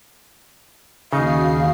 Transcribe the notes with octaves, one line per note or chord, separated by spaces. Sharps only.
D#2 C#3 D#4 F#4 F5 C7